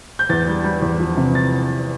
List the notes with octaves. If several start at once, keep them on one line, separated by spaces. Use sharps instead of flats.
G6
E2 A6
G3
G3
E2
F3
C3
A6